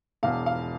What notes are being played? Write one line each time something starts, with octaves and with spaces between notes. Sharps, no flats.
E1 E2 B2 F5
F5